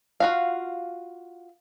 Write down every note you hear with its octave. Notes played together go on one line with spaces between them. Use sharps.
F4 F#4 F5